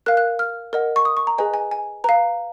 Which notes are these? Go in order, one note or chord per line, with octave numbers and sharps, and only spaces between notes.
A#4 F5 F#6
F#6
F6
A#4 D#5 F#5
C#6
D#6
C#6
A#5
G#4 B4 D#5 G#5
G#5
G#5
B4 F5 A#5